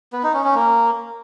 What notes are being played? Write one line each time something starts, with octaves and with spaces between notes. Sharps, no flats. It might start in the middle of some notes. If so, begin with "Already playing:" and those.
B3
D#4
C#4
C#4
A#3